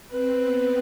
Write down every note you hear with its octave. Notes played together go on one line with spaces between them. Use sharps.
C4 B4
B3